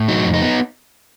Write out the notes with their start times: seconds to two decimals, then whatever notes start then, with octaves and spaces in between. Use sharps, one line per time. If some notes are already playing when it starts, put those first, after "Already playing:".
Already playing: A2
0.08 F#3 D#4
0.25 F2
0.34 D#4
0.42 B3